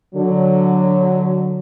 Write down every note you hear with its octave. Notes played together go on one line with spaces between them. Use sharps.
D3 F#3